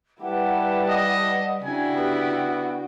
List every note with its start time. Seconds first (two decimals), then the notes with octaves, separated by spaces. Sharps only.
0.22 G3 E4 G4 B4 F#5 A5
0.89 D#5
1.64 C#3 D4 E4 F#4 G5 G#5
1.94 B3 G4